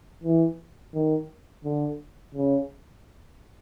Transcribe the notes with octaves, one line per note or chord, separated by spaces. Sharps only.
E3
D#3
D3
C#3